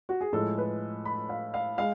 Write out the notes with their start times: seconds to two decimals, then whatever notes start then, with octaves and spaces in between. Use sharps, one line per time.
0.09 F#4
0.21 G#4
0.33 A2 F3 G#3 A4
0.58 B4
1.05 B5
1.29 F5
1.54 F5
1.78 G#3 F5